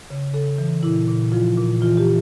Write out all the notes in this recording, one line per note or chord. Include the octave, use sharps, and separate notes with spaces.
C#3
C#3 A4
E3
A#2 E4
A#2
F3 F4
A#2
E3 F4
G4